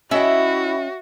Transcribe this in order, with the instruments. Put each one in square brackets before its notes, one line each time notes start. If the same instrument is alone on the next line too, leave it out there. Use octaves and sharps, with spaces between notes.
[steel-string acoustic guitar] C#4 D#5 G5 [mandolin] E4 [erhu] F#4